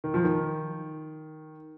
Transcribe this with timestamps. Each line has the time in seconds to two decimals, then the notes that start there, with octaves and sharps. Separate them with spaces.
0.04 D#3
0.14 F3
0.24 D#3